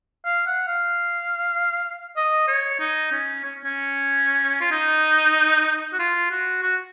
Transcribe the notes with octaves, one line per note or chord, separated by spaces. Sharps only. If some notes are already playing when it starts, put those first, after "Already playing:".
F5
F#5
F5
D#5
C#5
D#4
C#4
C#4
C#4
F4
D#4
F#4
F4
F#4
F#4